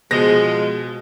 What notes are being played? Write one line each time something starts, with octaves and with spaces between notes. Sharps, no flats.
B2 F3 G#3 A#6